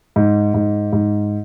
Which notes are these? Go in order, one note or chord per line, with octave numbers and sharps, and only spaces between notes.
G#2
G#2
G#2